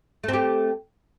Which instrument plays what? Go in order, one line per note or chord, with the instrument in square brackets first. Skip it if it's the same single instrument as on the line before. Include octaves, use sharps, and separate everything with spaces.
[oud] A3
C4
G4